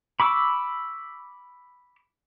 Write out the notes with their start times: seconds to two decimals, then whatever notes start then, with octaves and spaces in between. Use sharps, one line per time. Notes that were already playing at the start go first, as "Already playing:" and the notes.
0.20 B5 C#6 D6 E6